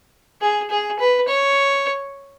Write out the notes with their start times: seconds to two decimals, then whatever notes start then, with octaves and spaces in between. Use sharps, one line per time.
0.41 G#4
0.70 G#4
0.99 B4
1.28 C#5